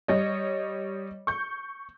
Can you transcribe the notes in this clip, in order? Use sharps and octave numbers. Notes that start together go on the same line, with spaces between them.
G3 C#5 D#5
C#6 G6